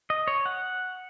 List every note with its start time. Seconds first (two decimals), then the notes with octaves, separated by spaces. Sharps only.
0.10 D#5
0.28 C#5
0.46 F#5